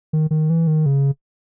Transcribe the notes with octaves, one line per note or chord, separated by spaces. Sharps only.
D#3
D#3
E3
D#3
C#3